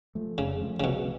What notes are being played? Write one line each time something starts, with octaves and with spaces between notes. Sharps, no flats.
F3 A3
F2 C#3
F3 A3
C#3
B1 B2